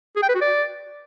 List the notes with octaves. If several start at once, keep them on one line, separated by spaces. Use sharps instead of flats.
G#4
G5
B4
F#4
D5